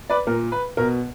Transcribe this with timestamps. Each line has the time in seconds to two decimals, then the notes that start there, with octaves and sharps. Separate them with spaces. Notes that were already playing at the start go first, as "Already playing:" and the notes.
0.10 B4 D5
0.27 A#2 A#4
0.52 B4
0.77 B2 A#4